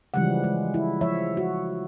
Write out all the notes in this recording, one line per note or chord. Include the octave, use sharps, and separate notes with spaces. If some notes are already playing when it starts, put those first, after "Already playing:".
C#3 E3 F3 G3 G#3 F#5
G#3
E4
F3 C#5 E5
F#4